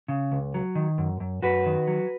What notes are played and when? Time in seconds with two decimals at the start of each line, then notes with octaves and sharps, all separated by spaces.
0.08 C#3
0.32 C#2
0.54 F#3
0.75 D#3
0.98 F#2
1.20 F#2
1.42 F#2 F#4 B4
1.66 D#3
1.87 F#3